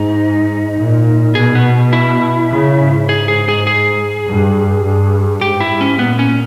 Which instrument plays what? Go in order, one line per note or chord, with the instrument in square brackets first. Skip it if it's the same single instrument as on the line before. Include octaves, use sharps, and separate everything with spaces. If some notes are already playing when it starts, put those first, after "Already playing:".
Already playing: [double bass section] G#2 [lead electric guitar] D#4
[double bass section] A#2
[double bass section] B2 [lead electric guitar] G#4
[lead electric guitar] B3
E4
[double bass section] C#3
G#2
[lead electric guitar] G#4
G#4
G#4
G#4
[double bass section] G2
G2
[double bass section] G#2 [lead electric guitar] G4
[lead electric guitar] E4
[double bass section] G#2
[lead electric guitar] C#4
[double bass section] A#2 [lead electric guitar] B3
[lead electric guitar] C#4